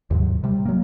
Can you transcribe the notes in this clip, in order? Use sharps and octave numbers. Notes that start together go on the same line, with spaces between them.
D#2 G#2 C3 F#3
C3 G3
F#3 A#3